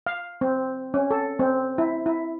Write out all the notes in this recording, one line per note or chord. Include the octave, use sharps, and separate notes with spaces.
F5
C4
C#4
A4
C4
E4
E4